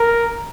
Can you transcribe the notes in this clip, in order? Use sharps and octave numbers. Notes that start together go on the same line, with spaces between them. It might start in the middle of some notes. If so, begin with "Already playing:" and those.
Already playing: A#4